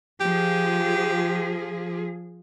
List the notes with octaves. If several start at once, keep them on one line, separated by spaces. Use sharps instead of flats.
F3 G4 G#4